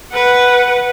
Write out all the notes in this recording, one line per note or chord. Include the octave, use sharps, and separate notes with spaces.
B4 F#5